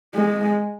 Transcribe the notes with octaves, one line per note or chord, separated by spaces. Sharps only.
G#3